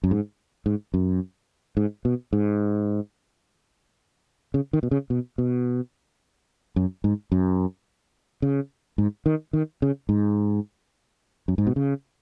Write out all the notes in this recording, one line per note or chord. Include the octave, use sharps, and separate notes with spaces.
F#2
G#2
G#2
F#2
G#2
B2
G#2
C#3
D#3
B2
C#3
B2
B2
F#2
G#2
F#2
C#3
G#2
D#3
D#3
C#3
G#2
F#2
G#2
B2
C#3